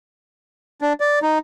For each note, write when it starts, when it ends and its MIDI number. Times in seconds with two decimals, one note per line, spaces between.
0.81 0.93 62
1.00 1.19 74
1.22 1.38 63